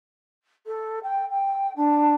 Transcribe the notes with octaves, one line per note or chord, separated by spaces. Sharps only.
A4
G5
G5
D4